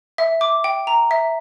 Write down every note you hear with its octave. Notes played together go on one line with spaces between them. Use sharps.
E5
D6
G5
A#5
E5